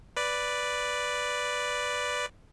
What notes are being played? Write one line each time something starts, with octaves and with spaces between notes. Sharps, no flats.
B4 D5